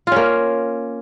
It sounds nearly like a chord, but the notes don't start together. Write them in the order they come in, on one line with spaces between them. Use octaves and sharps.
F4 C#4 A#3